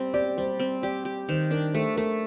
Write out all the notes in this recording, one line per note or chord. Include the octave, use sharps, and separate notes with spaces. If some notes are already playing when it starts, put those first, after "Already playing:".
Already playing: G3 C4 C5
G4 D5
G3 C5
C4
G4 D5
G4
D#3 C5
D4 A#4
A3 C5
A3 A#4